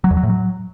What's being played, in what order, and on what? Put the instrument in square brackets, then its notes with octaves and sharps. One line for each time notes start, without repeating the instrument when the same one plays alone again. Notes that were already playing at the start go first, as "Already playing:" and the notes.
[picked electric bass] F#3
E2
F#3
A2
F#3